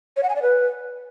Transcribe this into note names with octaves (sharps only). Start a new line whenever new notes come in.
C#5
F#5
G#5
D5
B4